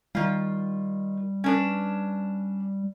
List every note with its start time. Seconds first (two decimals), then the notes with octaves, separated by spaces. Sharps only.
0.15 D#3 G3 F4
1.44 C#4 D4 B4